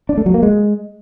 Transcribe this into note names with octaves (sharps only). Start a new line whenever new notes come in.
D4
A3
F#3
A#3
G#3